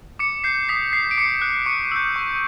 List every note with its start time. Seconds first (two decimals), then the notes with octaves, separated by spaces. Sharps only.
0.19 D6 C#7
0.44 G6 C7
0.69 D#6 B6
0.93 G6 C7
1.11 D7
1.18 D6 C#7
1.42 F#6
1.66 C#6 C#7
1.91 E6 G6
2.16 C#6